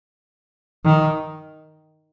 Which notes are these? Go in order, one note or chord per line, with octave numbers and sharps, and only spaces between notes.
D#3